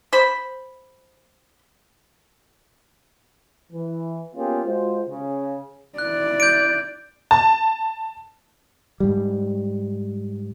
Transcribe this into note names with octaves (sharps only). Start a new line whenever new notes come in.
C5 B5
E3
A#3 B3 C#4 F4 G4 G#4
G#3 F4 F#4 C5
C#3
E4 D5 F#6
G6 D7
A5
G#2 G3